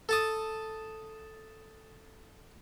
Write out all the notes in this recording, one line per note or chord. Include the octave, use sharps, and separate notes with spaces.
A4 A5 D#6